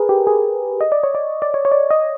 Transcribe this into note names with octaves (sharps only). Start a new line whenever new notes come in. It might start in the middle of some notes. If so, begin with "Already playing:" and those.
Already playing: G#4 A#4 B4
G4
G#4
D#5
D5
C#5
D5
D5
C#5
C#5
D5
D#5